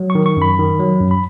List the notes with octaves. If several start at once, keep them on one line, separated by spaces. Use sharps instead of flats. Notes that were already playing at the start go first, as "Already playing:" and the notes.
Already playing: F#3
C#6
D#3
C#6
F#2 B5
D#3
F#3
F#2
B5